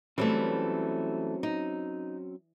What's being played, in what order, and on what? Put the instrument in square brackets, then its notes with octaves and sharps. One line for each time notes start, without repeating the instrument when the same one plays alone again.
[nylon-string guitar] E3 G3 A3 [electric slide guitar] F#3 C4 C#4
[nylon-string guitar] D#4